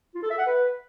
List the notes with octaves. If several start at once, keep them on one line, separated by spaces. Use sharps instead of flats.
F4
A4
E5
F#5
B4